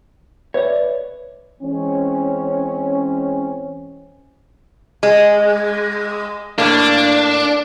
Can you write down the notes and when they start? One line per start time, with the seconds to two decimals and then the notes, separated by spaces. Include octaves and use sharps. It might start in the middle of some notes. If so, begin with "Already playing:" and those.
0.54 B4 C#5 D5 E5
1.62 E3 G#3 C4 C#4
5.03 G#3
6.58 A2 A#3 D4